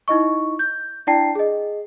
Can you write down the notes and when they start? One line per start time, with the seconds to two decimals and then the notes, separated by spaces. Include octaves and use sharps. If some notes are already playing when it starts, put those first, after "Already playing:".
0.08 D#4 E4 D#5 C#6
0.59 G6
1.07 D4 E4 D5 G5 A5 C7
1.35 G#4 D#5